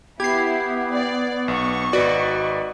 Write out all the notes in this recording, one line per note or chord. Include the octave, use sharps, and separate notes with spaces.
B3 E4 G4 G#6 C7
D5
B1 C#6
G#1 F#4 B4 D5 D#5